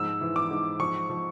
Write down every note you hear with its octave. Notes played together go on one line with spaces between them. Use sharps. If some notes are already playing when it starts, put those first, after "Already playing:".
Already playing: G#2 F3 E6
E3
D6
G#2
F3 C#6
F3